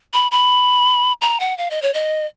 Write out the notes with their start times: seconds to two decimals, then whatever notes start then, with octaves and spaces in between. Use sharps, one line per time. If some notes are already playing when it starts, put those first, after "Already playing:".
0.13 B5
0.31 B5
1.22 A#5
1.40 F#5
1.58 F5
1.71 D#5
1.82 C#5
1.94 D#5